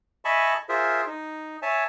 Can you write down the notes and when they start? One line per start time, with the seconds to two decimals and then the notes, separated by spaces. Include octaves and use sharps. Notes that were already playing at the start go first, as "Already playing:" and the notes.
0.25 D#5 E5 G#5 A5 B5 C#6
0.69 F4 G#4 A#4 C5 E5
1.07 D#4
1.62 C#5 E5 G#5 A5